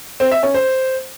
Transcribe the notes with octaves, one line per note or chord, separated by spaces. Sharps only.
C4
E5
C#4
C5